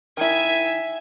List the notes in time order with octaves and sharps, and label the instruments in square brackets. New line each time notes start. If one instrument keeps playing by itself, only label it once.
[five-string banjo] D#3 E4 [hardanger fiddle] E5 G#5